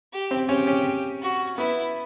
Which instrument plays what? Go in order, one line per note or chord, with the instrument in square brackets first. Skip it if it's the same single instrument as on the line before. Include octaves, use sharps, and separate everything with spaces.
[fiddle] G4
[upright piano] C4
[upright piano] C#4 [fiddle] G4
[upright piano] C#4
[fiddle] F#4
[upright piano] B3 [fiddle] E4